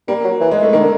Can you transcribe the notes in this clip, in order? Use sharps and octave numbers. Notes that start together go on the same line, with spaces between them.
G3 A#3
F#3
E3
G#3
A3
D#3 A#3
D3